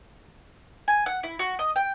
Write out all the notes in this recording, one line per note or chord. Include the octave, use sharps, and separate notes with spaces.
G#5
F#5
E4
F#4
D#5
G5